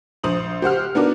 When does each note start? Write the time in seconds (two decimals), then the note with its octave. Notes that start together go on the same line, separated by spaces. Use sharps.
0.23 A#1 C5 D#6 F#7
0.62 G4 C5 F#5 F6
0.95 B3 D4 D#4 F#4 A#4 D5